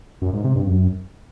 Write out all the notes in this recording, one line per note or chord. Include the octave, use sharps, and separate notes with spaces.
F#2
G#2
C3
G2
F#2